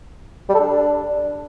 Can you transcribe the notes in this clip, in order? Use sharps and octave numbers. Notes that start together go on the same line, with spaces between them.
G3
A4
D4